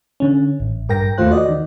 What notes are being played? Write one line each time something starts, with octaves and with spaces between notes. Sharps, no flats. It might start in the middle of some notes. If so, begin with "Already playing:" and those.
D3 C#4
A1
G2 A#4 G5 A#6
D#2 A3 F4 C5 F#6
F#4 D5 D#5
D#3